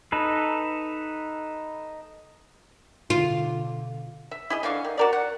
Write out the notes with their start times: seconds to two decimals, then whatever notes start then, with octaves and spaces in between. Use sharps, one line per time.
0.12 D#4 A4 B4
3.10 B2 D3 F4
4.31 E5
4.50 E4 G#4 D#5
4.63 D3 E3 F5 C#6
4.85 D#3
4.98 F#4 A#4 D5
5.13 F#5